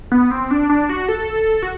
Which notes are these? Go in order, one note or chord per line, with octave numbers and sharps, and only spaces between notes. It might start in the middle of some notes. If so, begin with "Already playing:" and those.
B3
C4
D4
D4
F#4
A4
F#4